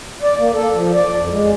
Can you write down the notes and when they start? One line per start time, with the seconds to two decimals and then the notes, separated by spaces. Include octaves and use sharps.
0.22 D5
0.38 A#3
0.53 A4
0.74 F3
0.94 D5
1.16 F2
1.30 G#3